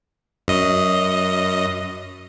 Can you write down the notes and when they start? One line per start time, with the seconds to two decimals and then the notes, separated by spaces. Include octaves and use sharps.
0.48 F#2 D#5